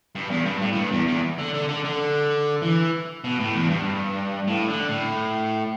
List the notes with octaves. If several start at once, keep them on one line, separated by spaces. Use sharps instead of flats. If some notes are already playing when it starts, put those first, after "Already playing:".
G2
E2
G2
A2
A2
G2
E2
E2
D3
D3
D3
D3
E3
B2
A2
E2
G2
A2
D3
A2